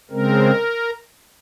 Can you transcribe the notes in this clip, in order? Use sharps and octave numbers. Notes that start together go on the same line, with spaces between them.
C#3 G#3 C4 A#4